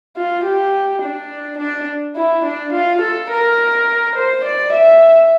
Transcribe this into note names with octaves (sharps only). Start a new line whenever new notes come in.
F4
G4
D4
D4
E4
D4
F4
A4
A#4
C5
D5
E5